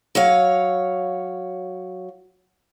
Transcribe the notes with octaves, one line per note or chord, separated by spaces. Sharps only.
F#3 C#5 F5